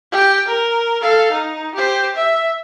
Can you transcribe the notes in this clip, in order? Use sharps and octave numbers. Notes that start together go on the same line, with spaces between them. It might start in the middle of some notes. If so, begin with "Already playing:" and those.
G4 G5
A#4
A4 F5
D#4
G4 C5
E5